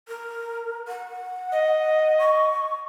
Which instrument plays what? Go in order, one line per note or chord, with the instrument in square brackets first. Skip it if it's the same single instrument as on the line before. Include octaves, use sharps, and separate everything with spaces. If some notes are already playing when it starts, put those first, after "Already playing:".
[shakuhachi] A#4
F#5
[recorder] D#5
[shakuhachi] C#6